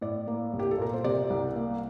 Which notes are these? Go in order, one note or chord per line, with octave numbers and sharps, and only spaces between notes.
A2 D5
A#3
C2
G4
A4
A#2 A#4
C5
C3 D5
C2
A#3